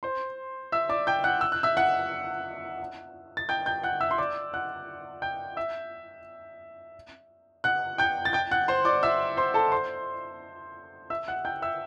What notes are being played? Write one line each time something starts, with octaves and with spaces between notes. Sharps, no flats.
C5 C6
E5 E6
D5 D6
G5 G6
F#5 F#6
E6
F#6
E5 E6
F#5 F#6
A6
G5 G6
G5 G6
F#5 F#6
E5 E6
C6
D5 D6
F#5 F#6
G5 G6
E5 E6
F#5 F#6
G5 G6
A6
G5 G6
F#5 F#6
C5 C6
D5 D6
E5 E6
C5 C6
A4 A5
C5 C6
E5 E6
F#5 F#6
G5 G6
E5 E6